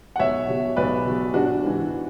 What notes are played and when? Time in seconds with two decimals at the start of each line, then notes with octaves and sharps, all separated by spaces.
0.16 F#5
0.19 B1 C#5 E5
0.48 B2 F#3
0.76 B1 B4 D5
1.06 B2 F#3
1.34 G#1 D4 F#4
1.62 G#2 E3